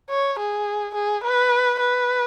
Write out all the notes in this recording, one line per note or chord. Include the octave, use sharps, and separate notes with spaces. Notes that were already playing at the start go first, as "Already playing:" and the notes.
C#5
G#4
G#4
B4
B4